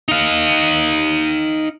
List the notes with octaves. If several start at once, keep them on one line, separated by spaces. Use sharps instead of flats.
D#4 F5